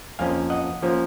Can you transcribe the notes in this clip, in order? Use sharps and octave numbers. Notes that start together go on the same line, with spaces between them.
F2 F3 A#3 C#4 F5 G#5
D#5 F#5
F3 A#3 C#4